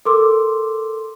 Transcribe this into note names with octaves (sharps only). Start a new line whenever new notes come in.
A4 A#4 C6 D6 E6